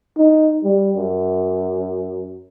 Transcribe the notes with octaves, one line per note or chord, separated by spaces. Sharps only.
D#4
G3
F#2